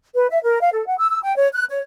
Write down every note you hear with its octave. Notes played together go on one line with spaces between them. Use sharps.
B4
E5
A#4
F5
A4
F#5
E6
E6
G5
C#5
F#6
C#5